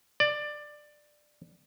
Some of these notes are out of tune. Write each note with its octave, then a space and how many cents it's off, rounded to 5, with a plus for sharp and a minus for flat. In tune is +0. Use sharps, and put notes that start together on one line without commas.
D5 +15